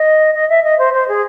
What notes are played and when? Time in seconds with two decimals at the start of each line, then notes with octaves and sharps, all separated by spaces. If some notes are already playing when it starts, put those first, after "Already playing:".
Already playing: D#5
0.35 D#5
0.49 E5
0.64 D#5
0.79 C5
0.93 C5
1.08 G#4